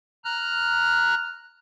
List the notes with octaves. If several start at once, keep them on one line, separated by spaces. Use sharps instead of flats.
A#5 F6 F#6